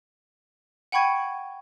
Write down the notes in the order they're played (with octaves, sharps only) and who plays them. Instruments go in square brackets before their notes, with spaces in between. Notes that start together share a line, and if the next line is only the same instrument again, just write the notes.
[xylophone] F#5 G5 B5 C#6 G#6 D#7